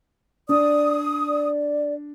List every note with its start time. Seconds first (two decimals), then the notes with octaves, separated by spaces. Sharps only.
0.49 D4 D5 D#6
1.28 D5